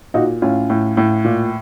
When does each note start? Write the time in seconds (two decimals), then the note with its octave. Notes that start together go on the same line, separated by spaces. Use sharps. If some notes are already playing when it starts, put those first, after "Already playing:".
0.14 A#2 D#4 F#4
0.42 A2 C#4 F4
0.70 A2
0.97 A2
1.25 A#2